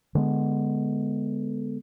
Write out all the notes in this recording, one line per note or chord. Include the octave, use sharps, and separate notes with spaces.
D3 G#3 B3